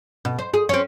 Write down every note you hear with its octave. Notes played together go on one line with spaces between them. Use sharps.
B2
C5
G#4
C4 C#4